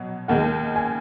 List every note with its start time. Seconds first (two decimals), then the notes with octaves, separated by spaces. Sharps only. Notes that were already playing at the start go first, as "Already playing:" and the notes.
Already playing: B2 F#3
0.28 D#2 D#3 G#3 F#5
0.76 G#5